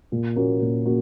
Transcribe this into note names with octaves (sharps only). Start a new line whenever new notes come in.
A#2
A#3 C#4 F#4
A#2
A#3 C#4 F#4